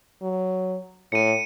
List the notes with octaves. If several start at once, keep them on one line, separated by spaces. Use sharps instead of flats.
F#3
A2 C#7 D#7